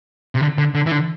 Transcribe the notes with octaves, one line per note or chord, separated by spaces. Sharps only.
C3
D3
D3
D3
E3
D3